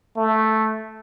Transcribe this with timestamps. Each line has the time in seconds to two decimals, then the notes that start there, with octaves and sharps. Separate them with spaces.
0.17 A3